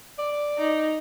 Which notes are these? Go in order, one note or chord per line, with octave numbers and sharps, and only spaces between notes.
D5
D#4